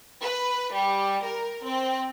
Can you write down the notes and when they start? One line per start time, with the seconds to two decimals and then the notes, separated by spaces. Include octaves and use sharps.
0.22 B4
0.73 G3
1.24 A#4
1.64 C4